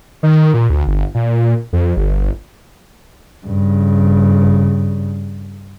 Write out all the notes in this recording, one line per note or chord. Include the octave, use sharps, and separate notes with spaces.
D#3
A#2
D2
G1
A#2
F2
G1
G2 C#3